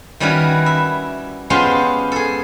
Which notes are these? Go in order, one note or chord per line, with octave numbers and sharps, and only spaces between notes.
D#3 G3 C#4 E4 F#4 B4
E5
G#3 B3 C#4 F4 G4 C5
G#4 A4